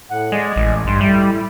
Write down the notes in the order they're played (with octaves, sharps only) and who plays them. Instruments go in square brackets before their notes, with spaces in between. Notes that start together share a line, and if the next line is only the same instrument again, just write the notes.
[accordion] A2 F#5
[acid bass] G#3 [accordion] D5 D#5 G#5
[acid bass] A1
[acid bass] G2 [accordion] C6
[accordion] A2 E4 [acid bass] G3